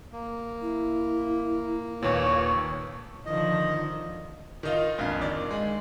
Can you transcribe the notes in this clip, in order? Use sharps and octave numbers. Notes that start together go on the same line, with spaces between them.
A#3
E4
D#2 A#2 B4 C#5
D3 D#3 F3 D#5
D#3 D#4 F4
A#1 F2 F5
D#3 D5
G#3